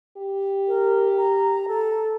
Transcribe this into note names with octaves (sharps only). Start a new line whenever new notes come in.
G4
A#4
A#5
A4